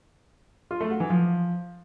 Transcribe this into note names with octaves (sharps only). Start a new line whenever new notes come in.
F4
A3
F#4
E3
F3